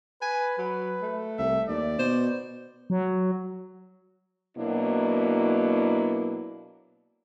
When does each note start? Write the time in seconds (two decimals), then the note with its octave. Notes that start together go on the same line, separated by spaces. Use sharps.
0.22 B4 G#5
0.58 F#3 B4
1.02 A3
1.39 C2 E5
1.69 D#2 D5
1.99 B2 C5
2.90 F#3
4.58 B2 F#3 A#3 D4 E4